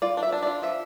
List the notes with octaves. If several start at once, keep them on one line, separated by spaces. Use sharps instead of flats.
F4 D5
D4
E5
D4
F4 D5
F3 E5